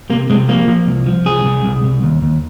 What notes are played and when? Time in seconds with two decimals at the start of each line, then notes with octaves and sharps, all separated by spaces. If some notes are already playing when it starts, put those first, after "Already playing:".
0.10 C3 A#3
0.30 C3 G#3
0.49 F3 A#3
0.68 F3
0.87 C2
1.07 F3
1.26 C2 G#4
1.45 C2
1.65 C2
1.84 C2
2.03 D#2
2.22 D#2